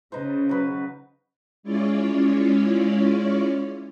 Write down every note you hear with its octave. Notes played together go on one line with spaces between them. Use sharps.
C#3 D#4 B4 C5
F#3 B4
G#3 C#4 E4 F4 C#5 D5